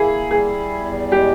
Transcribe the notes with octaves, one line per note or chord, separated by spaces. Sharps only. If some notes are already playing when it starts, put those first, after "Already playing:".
Already playing: A#3 E4 G#4
G3 G#4
E2
G#3 G4